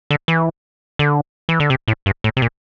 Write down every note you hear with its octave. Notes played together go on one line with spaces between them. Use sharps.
D3
E3
D3
E3
D3
C3
A2
G2
A2
C3
A#2